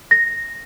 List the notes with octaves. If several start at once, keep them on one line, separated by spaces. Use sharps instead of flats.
A#6